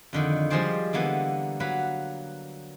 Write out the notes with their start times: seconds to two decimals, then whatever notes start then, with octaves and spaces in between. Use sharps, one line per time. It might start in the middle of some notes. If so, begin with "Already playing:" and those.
0.13 F2 D3 D#3
0.50 F3 G3 G#3 G#4 C5 D5
0.93 D3 E3 A#3 B3
1.60 F#3 A#3 B4 F#5 B5